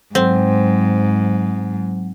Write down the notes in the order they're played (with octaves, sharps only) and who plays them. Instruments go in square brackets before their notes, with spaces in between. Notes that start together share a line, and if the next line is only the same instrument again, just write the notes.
[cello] G#2 [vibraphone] F#3 [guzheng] C4